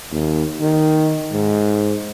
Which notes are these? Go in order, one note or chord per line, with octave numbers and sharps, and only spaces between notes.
D#2
D#3
G#2